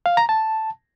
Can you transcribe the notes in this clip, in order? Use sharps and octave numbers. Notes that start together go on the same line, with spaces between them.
F5
A#5
A5